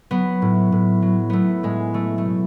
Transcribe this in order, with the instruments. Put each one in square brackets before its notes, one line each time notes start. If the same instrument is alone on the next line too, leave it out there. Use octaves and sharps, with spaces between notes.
[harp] F#3 B3
A2
A2
F#3
F#3 A3 B3
A2 G#3
F#3 A3
A3
B2